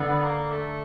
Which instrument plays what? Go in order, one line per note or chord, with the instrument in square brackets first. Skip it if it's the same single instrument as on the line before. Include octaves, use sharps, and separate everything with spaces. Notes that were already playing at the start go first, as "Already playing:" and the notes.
Already playing: [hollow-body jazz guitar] D3 [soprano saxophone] B3
[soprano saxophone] A#3
A3